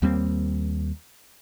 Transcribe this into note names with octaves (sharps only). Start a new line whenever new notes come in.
D#2 G3 A#3 C4